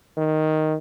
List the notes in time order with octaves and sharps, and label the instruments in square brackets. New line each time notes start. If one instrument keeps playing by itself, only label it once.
[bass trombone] D#3